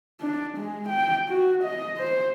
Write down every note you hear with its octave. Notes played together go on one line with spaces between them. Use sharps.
D4
G#3
G5
F#4
D#5
C5